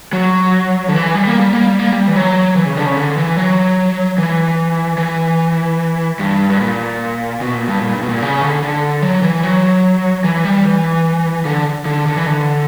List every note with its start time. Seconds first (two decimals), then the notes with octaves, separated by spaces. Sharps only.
0.13 F#3
0.88 D3
0.94 E3
1.15 G3
1.27 A#3
1.40 G3
1.53 A#3
1.66 G3
1.79 A#3
1.92 G3
2.08 E3
2.16 F#3
2.56 E3
2.66 C#3
2.77 D3
2.86 C#3
2.97 D3
3.17 E3
3.37 F#3
4.18 E3
4.98 E3
6.19 G2
6.50 G2
6.60 A#2
7.41 B2
7.54 A#2
7.68 G2
7.82 A#2
7.95 G2
8.03 B2
8.09 A#2
8.22 C#3
8.42 D3
8.63 D3
9.03 F#3
9.23 E3
9.43 F#3
10.24 E3
10.45 G3
10.65 E3
11.45 D3
11.85 D3
12.06 D3
12.17 E3
12.27 D3